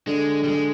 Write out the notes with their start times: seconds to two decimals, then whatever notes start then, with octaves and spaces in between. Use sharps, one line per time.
0.07 D3 G#3
0.44 G3
0.48 G#3